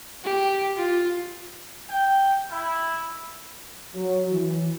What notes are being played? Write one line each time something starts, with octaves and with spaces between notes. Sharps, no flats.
G4
F4
G5
E4
F#3
E3